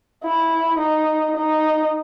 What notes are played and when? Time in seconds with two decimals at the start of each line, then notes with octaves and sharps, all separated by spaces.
0.23 E4
0.79 D#4
1.36 D#4